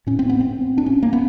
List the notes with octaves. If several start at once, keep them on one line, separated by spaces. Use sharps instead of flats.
A2 C#4
C4
B3
C4
D4
C#4
A#3
B3